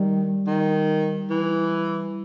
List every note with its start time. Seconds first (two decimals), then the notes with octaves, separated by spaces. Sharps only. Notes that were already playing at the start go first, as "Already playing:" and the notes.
Already playing: D#3 G3
0.47 D#3
1.30 E3